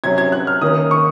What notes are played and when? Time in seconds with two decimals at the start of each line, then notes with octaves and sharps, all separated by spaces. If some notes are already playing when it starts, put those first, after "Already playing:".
0.04 C3 F#3 C#4 G#6
0.18 G#6
0.32 F#6
0.47 F6
0.61 D#3 A#3 C#4 D#6
0.91 C#6